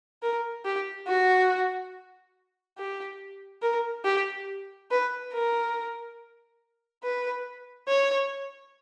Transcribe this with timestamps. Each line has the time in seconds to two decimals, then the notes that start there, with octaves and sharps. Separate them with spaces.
0.23 A#4
0.65 G4
1.07 F#4
2.77 G4
3.62 A#4
4.05 G4
4.91 B4
5.33 A#4
7.04 B4
7.88 C#5